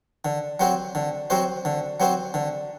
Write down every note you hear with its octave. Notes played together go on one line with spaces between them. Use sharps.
D3
F#3 C4 F#4 C5
D3
F#3 C4 F#4 C5
D3
F#3 C4 F#4 C5
D3